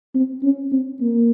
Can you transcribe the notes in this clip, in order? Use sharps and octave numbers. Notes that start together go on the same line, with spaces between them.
C4
C#4
C4
A#3